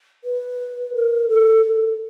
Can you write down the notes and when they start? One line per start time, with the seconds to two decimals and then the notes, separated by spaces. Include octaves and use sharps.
0.24 B4
0.94 A#4
1.29 A4